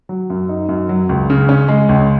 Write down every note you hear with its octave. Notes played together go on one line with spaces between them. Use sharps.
F#3
F#2
D#4
F#2
F#3
C#2
C#3
C#4
G#3
C#2